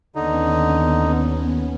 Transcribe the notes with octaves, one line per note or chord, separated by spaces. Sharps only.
D#2 D3 B3 C#4 D#4